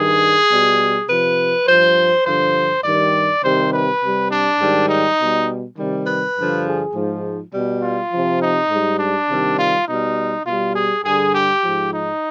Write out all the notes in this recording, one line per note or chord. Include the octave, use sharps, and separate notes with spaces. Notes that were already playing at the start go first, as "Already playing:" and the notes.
Already playing: G2 D#3 G3 G#4
B2 G3
C3 F3 B4
G2 F3 C5
G2 D3 F3 C5
G2 D#3 G3 D5
C3 D#3 G3 C5
B4
C3 G3
D4
G#2 D#3 G3
D#4
B2 G3
C3 D#3 G3
B4
G2 D3 F3
G#4
G#2 F3
B2 G3
F4
C3 F3
D#4
G#2 G3
D4
C3 D#3 G3
F4
B2 G3 D#4
B2 G3 F4
G#4
G2 D3 G3 G#4
G4
G#2 F3
D#4